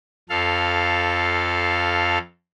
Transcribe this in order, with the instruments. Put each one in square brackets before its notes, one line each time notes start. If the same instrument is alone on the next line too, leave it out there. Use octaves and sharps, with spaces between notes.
[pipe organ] F2 A4 F5